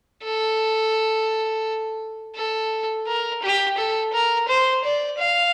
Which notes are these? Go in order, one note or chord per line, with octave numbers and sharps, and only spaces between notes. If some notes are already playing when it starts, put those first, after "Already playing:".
A4
A4
A#4
G4
A4
A#4
C5
D5
F5